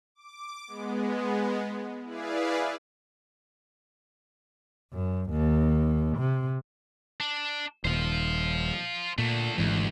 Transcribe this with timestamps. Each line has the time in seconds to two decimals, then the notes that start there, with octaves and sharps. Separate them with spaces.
0.15 D6
0.67 G#3 B3
2.04 E4 G#4 B4 D5 F5
4.92 F#2
5.30 D#2
6.18 C3
7.20 D4
7.85 D#1 C5 F5
9.18 A#2 D3 A3
9.58 G#1 D2 G#2 E3